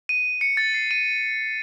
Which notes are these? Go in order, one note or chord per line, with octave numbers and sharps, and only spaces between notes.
D#7
C#7
A6
C7
D#7